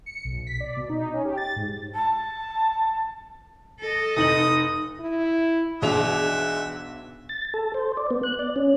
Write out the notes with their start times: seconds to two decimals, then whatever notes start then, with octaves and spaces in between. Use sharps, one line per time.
0.06 C#7
0.24 B1
0.47 B6
0.60 D5
0.76 B2
0.89 D#4
1.14 C#4
1.25 G4
1.37 A6
1.56 G#2
1.94 A5
3.80 A4 D#5
4.17 F1 D#4 D#6 F#7
5.00 E4
5.82 B1 E2 G#3 D4 G#4 E5 F#5 F7
7.29 A6
7.54 A4
7.74 C5
7.97 D5
8.10 B3
8.23 F#6
8.39 D5
8.56 C#4